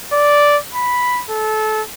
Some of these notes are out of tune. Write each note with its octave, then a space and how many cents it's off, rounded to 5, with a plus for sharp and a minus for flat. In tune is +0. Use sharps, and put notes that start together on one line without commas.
D5 -5
B5 +0
A4 -25